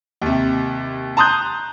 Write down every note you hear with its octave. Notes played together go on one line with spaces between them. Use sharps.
D#2 C3
A5 A#5 C6 D#6 F#6 G6